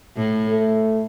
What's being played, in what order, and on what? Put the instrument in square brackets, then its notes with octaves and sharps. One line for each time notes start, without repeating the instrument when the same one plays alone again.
[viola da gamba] A2
[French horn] A3